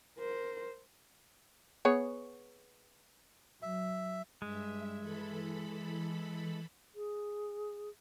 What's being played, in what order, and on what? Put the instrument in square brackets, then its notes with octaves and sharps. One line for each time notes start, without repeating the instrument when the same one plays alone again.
[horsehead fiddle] A#4 C5
[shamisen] B3 G#4 C#5
[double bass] F#3 [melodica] E5
[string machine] G2 E5 [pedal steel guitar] G#3
[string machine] E3 A4 B5
[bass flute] G#4